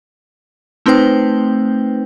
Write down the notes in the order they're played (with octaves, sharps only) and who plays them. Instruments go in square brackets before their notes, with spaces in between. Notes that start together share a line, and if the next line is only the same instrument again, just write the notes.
[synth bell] A3 C4 D#4 B4 C5 G5